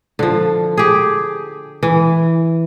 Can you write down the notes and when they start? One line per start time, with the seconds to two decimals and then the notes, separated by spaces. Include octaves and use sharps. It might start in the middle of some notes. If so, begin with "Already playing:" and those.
0.19 D3 F3
0.77 G4 G#4
1.83 E3